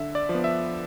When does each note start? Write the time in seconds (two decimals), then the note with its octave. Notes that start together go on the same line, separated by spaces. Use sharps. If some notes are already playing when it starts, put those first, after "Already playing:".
Already playing: D3 E5
0.15 D5
0.29 F3
0.35 B3
0.44 E5